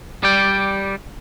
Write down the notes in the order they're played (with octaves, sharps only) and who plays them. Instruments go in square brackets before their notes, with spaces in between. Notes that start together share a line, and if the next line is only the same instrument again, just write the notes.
[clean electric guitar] G3 D5 G5